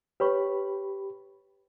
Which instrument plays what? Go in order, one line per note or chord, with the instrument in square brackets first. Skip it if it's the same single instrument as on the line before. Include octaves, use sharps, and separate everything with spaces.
[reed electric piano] G4 B5 [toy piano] B4 C#5 C#6